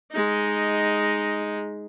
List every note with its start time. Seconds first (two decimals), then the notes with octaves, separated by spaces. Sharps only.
0.11 G#3 D#4